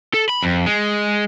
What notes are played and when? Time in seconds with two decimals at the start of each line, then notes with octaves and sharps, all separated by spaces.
0.14 A4
0.29 B5
0.43 F2
0.66 G#3